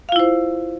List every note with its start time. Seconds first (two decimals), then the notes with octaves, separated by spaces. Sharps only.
0.09 F5
0.12 F4
0.16 E4
0.19 C5